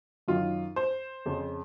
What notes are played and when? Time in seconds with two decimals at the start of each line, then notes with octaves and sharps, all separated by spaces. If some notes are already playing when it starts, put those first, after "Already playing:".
0.28 F#2 D#3 F4
0.76 C5
1.26 F2 C#3